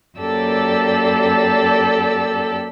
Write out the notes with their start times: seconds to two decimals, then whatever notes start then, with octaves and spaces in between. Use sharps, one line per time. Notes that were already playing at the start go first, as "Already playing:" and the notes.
0.18 F#2 A#3 G4 A4 D5 E6